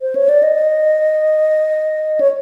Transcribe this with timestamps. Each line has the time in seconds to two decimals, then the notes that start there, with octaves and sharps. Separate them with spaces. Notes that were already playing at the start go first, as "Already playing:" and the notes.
0.02 C5
0.16 C#5
0.29 D5
0.43 D#5
2.20 C#5